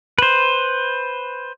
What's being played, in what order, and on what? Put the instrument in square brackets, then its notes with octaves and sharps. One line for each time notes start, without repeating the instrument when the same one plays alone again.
[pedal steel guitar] B4 C5